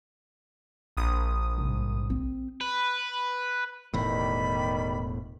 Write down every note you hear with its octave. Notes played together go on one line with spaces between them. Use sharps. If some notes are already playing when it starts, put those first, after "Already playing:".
A#1 D#6
C2 G#2
C4
B4
E1 E2 A2 D#3 G3 B5